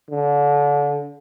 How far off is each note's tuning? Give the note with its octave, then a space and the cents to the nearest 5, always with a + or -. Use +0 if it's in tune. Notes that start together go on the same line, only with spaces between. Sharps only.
D3 -30